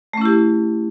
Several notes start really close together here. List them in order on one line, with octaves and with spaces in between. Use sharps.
A3 C#4 E4 G4